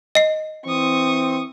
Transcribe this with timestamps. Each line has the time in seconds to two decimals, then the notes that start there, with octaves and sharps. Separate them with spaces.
0.15 D#5 C7
0.66 E3 C4 C#6 D#6